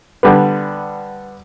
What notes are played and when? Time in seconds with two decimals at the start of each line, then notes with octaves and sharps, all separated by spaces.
0.23 D3 G3 B3